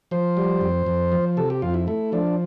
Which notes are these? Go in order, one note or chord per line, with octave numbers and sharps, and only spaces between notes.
F3 C5
G3
F2
F2
F3
C3 A4
G4
F2 F4
E4
A3 E4
F3 D4